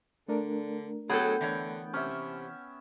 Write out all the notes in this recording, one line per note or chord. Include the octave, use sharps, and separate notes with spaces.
D3 A3 D4 A#4
F#3 B3 G#4 A4 G5
D3 E3 C#5
C3 C#4 E5